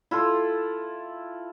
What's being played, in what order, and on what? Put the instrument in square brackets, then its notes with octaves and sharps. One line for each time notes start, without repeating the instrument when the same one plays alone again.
[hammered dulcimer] E4 F4 A4